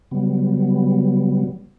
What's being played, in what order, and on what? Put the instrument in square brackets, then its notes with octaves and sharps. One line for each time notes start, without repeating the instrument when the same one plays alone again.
[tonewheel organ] C#3 F#3 G3 B3